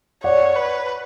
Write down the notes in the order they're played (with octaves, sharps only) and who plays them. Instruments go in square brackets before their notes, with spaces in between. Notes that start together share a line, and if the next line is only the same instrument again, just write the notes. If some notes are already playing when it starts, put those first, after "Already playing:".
[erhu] C#5 [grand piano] D5 F#5
[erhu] B4